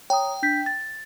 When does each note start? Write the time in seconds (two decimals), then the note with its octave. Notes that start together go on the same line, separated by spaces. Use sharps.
0.10 C#5 G5 A#5 D#6
0.43 D4 G6 B6
0.66 A6